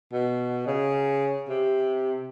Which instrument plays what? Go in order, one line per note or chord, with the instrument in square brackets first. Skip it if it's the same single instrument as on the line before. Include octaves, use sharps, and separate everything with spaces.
[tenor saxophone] B2
C#3
C3